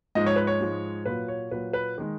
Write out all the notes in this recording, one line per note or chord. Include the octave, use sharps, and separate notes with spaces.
G#2 F3 G#3 D#5
C#5
B4
C#5
G#2 F3 G#3
A#2 F#3 B4
C#5
A#2 F#3 B4
B4
D#3 G#3